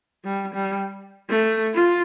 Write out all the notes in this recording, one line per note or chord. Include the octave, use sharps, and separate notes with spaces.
G3
G3
A3
F4